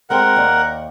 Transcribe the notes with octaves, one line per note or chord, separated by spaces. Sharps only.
G#3 C4 A#4 F#5 G5
D#2 D5